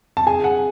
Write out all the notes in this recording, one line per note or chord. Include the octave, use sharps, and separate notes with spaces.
A5
G#4 G#5
F#5